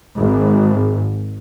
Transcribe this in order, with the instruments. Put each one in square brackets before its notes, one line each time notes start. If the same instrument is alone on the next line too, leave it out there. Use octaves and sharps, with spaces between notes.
[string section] G#1